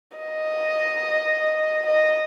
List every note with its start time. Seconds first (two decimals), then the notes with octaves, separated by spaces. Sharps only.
0.17 D#5
1.86 D#5